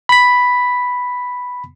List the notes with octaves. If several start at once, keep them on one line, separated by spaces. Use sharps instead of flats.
B5 B6